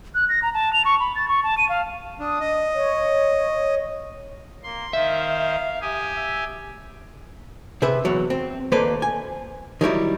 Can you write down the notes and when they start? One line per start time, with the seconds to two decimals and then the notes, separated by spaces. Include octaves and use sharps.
0.15 F#6
0.29 A#6
0.42 A#5
0.54 A5
0.73 F7
0.85 C#6
1.00 B5
1.15 A6
1.28 C#6
1.44 A5
1.58 D#7
1.69 F5
2.20 D4 D#6
2.41 D#5
2.74 C#5
4.63 A#3 C6
4.93 D#3 C5 E5 F5
5.81 G4 G#5 D#6
6.17 E5
7.82 C3 G#4 B4 E5
8.05 E2 F#3
8.30 C4
8.72 D#2 A#3 A4 B4 C5 D5
9.02 G#5
9.81 D#3 F#3 G3 E4